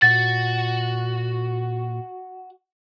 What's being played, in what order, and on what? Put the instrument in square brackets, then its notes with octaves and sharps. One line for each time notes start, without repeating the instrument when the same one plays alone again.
[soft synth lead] A#2 [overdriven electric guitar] F#4 [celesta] A6